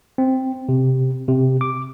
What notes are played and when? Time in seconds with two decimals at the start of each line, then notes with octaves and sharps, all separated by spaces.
0.18 C4
0.69 C3
1.28 C3
1.61 D6